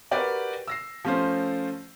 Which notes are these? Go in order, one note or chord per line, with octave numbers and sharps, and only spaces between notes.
F#4 G4 A#4 B4 D5 G5
E6 A#6 C7
F3 A3 C#4 F4 C5